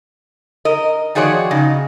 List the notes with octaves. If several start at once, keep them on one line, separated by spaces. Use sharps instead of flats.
A#4 D#5
D#3 F3 F#4 G#4 C#5 D5
C#3 D#4